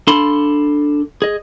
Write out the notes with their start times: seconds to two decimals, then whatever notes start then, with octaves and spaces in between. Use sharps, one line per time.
0.07 D4 A4 F5 A5 B5 C6
1.22 G#4 D#5